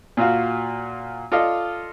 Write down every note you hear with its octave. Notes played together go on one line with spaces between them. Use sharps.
A#2 F4 F#4 F5
F4 A4 D5 D#5 F5